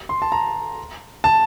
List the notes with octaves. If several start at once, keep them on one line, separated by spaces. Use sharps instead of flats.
C6
A5
A#5
A5